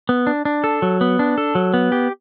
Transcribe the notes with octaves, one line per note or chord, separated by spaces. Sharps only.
B3
D4
D4
A4
F#3
B3
D4
A4
F#3
B3
G4